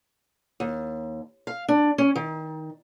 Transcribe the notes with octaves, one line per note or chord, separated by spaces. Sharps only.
D#2
F5
D4
C#4
D#3